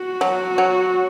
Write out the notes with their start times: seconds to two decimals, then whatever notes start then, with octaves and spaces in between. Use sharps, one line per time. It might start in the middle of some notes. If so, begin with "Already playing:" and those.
Already playing: F#4
0.21 F#3
0.58 F#3